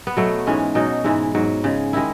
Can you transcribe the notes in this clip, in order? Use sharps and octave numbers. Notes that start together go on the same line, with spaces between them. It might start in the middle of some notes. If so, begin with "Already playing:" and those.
B3
B2 F#3 A3
G#2 E3 G#3 C#4
B2 F#3 D#4
G#2 E3 G#3 E4
G#2 F#3
C#3 G#3
D#3 G#3 E4